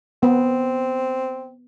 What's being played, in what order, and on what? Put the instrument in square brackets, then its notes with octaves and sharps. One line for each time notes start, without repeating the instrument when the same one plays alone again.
[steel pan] B3 [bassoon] C4